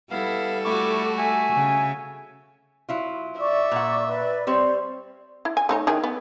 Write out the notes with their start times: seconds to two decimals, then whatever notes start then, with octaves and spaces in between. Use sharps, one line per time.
0.11 G3 B3 E4 A4 F5
0.65 A3 E4 F#4 C#6 D6
1.19 E5 G#5
1.53 C#3
2.89 F#3 E4 F4
3.40 D5 E5 C#6 D6
3.72 A#2 F#5
4.08 B4 D5
4.47 G3 C4 C5 C#5
5.45 E4
5.57 G#5
5.69 A3 D#4 C#5
5.87 D#3 E3 G#4
6.04 B3